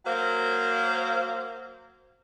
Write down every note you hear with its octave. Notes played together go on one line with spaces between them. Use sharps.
F#3 A#3 C5 F5